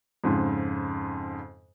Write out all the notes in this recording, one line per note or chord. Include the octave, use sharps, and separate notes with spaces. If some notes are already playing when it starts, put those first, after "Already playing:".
F2 G#2 C#3